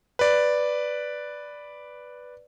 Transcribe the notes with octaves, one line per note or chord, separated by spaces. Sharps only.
B4 D5